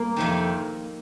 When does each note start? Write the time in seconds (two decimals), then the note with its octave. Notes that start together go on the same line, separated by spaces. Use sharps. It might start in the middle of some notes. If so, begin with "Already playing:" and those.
Already playing: A#3
0.16 F2 C3 D#3